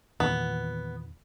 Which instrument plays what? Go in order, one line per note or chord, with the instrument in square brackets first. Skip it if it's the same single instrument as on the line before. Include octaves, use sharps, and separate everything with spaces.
[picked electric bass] E2 A#2 D#3 [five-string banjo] B3